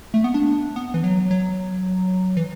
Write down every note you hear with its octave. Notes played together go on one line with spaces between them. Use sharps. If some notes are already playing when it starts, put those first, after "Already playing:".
A3
B3
D4
B3
E3
F#3
F#3
E3